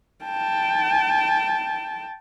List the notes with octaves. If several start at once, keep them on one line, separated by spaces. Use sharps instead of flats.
G5 A5